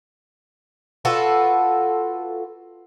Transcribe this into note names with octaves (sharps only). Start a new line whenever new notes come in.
F4 F#4 A4 B4